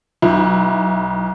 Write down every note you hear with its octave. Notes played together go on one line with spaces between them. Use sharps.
B1 E4